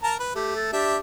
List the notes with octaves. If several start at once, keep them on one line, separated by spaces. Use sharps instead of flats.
A#4 A5 A#5
B4
A3 G4
A4
D4 G4 E5